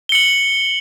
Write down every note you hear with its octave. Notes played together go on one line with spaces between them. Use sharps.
C#7 F#7 G7